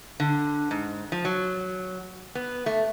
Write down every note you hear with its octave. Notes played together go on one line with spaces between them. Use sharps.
D3
G#2
F3
F#3
B3
A3